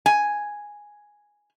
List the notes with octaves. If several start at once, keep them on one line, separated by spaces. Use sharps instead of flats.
G#5